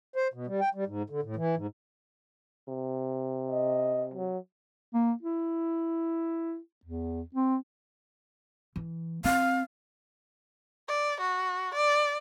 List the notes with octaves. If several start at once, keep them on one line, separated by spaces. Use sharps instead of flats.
C5
B2
G3
G5
G3
G#2
D3
A2
E3
G#2
C3
D#5
F#3
A#3
E4
E2
C4
E3
C4 F5
D5
F#4
D5